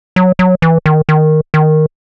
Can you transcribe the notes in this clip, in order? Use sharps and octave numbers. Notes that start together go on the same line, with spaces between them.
F#3
F#3
E3
D#3
D#3
D#3